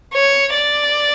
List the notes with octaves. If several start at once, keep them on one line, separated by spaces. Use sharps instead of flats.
C#5
D5